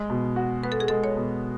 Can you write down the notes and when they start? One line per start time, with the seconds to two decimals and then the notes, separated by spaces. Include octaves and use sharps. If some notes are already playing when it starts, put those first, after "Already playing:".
Already playing: G#3
0.10 B2
0.36 F#4
0.63 B3 B4
0.72 A4
0.80 G#4
0.88 G#3 A4
1.04 C#5
1.17 B2